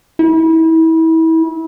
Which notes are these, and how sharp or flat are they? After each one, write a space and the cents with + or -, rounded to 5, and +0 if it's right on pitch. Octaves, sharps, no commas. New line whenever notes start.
E4 -30